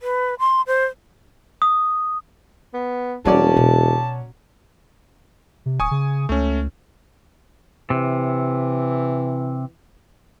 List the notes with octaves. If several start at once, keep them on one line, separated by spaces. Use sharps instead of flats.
B4
C6
C5
D#6
B3
E1 F#3 G3 C#4 D5 A5
B2
C3
D1 G#5 C#6 D#6
C#3
C#2 A3 C#4
C3 E3